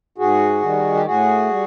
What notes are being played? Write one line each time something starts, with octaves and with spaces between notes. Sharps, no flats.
G#2 F#4 G#4
D#3 G3
G4
A2 F#4 G#4
G3